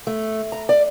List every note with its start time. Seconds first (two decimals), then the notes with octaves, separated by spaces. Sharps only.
0.07 A3
0.52 A#5
0.69 D5